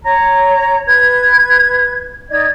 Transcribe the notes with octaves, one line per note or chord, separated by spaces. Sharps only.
C#5 A#5
B4 G#6
D#4 D5 D#5 G#6